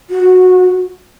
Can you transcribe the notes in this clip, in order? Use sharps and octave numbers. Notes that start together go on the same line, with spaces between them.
F#4